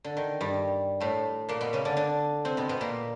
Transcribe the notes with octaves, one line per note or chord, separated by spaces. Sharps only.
D3
D#3
G2 G3
A2 A3
A#2 A#3
B2 B3
C#3 C#4
D3 D4
D3 D4
C3 C4
B2 B3
B2 B3
A#2 A#3